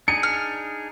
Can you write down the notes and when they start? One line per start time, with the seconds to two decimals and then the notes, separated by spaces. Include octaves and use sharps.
0.08 D4 D#4 G#4 C#7
0.23 F6